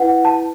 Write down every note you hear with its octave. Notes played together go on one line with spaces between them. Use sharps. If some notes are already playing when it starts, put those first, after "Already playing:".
Already playing: E4 B4 F#5
A5